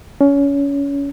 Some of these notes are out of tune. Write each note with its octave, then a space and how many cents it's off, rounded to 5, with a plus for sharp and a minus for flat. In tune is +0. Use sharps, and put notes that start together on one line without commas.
C#4 +25